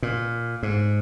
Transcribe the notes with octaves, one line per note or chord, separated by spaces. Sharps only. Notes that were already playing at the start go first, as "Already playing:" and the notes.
A#2
G#2